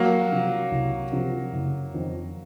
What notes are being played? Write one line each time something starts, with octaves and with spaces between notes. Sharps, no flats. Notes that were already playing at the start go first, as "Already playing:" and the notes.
Already playing: F#3 A#3
C3 F3
C2
C3 F3
F#1
F2 D#3